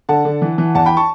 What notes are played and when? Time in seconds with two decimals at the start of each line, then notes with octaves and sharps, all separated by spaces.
0.09 D3 F#5 A5
0.25 D3
0.42 E3
0.58 E3
0.75 E2 F#5 A5
0.86 G5 B5
0.97 A5 C#6